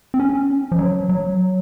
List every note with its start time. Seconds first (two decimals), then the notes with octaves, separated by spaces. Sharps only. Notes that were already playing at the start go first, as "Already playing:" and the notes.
0.14 C4
0.20 C#4
0.72 F3
0.79 F#3
1.09 F#3